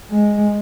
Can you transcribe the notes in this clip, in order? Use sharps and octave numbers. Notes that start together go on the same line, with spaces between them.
G#3